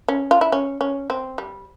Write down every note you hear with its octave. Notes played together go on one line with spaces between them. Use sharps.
C#4
F4
E4
C#4
C#4
C4
G3